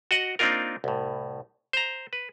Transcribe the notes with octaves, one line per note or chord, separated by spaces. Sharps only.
F#4 D#5 F#5
A#3 C4 D4 D#4 F4 A#4
C2 A2
C5 A#5
B4